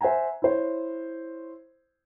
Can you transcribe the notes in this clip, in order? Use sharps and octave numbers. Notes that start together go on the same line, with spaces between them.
C5 E5 F#5 G#5 A#5
E4 C5 C#5